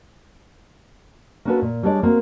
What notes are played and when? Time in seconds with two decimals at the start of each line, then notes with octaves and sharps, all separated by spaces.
1.45 A#3 C#4 D4 F#4 A4 B4
1.62 A#2
1.83 G3 G#3 D4 C#5 D5
2.03 A#3 C4 F#4